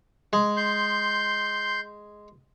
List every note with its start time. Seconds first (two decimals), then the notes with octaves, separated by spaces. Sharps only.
0.33 G#3
0.57 C6 G6